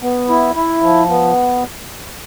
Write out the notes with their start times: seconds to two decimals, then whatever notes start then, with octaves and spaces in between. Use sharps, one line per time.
0.02 B3
0.29 E4
0.56 E4
0.83 F3
1.09 B3